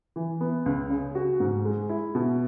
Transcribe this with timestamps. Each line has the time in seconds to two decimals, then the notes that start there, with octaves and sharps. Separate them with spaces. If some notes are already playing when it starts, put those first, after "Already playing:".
0.16 E3
0.40 B3
0.66 C#2
0.90 C#3
1.15 F#4
1.40 G#2
1.65 G#3
1.89 E4
2.15 B2